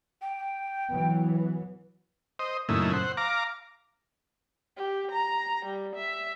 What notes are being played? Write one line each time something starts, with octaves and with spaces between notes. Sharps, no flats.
G5
E3 F#3 B3
C5 D#5
F#2 A#2 C#3 A3 D#4 E4
C5 F#5
F5 A#5 D6
G4
A#5
G3
E5